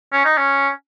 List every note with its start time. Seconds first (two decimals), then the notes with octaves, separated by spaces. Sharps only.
0.13 C#4
0.25 D#4
0.38 C#4